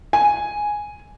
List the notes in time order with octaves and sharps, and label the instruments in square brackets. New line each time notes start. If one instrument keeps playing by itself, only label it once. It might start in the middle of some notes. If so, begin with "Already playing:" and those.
[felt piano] G#5